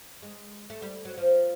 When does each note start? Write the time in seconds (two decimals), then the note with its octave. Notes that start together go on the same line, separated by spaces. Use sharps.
0.22 G#3
0.70 A3
0.82 G3
1.05 F#3
1.18 F3